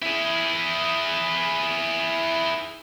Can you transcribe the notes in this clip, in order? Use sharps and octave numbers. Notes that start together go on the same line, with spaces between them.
E4 G#4